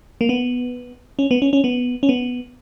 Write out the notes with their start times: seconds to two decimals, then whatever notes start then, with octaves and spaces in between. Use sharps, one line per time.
0.21 A#3
0.29 B3
1.19 C#4
1.31 B3
1.42 C#4
1.53 C#4
1.64 B3
2.03 C#4
2.09 B3